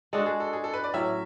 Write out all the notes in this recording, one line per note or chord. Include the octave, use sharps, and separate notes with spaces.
G#3 D4 F#4 A4
G#4
A4
G#4
A4
B4
D5
A2 F#3 C#4 E5